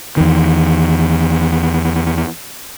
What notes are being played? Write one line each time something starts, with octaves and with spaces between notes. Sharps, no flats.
E2 D#3